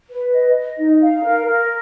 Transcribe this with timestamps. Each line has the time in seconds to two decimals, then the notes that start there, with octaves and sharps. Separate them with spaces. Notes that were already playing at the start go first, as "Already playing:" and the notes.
0.09 B4
0.31 D#5
0.54 D#5
0.77 D#4
1.00 F5
1.23 A#4
1.45 A#4